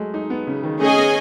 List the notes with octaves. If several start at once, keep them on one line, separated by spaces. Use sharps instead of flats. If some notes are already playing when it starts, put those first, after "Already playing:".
Already playing: F#3 G#3 A3
D#4
B3
C#3
D#3
A3 C#4 G#4 D#5 G#5
B3